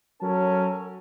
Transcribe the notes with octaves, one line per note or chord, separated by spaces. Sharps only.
F#3 C#4 A4 A#4 A5